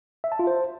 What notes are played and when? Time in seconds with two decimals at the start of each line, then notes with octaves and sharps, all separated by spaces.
0.24 E5
0.32 A5
0.39 F4
0.47 C5